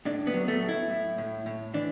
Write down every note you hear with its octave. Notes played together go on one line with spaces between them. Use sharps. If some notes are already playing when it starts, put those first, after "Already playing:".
A2 D4
B3
F#3
A3
A2
E4
A2
A2
A2
E3 D4